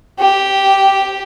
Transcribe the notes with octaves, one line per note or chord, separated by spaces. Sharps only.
G4